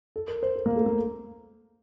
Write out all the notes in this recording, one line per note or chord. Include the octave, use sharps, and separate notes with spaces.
A4
A#4
C5
A4
A#3
A3
A#3